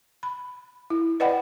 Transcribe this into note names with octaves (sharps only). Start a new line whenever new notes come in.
B5
E4
B4 D5 D#5 F#5 G5 B5